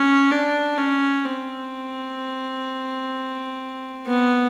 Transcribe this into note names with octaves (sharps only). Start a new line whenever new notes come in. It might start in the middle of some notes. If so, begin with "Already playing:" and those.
Already playing: C#4
D4
C#4
C4
B3